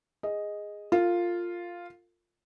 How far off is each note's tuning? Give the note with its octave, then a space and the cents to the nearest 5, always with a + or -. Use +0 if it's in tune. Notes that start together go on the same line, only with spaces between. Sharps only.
G#4 -10 D#5 +0
F4 +0 A#4 -45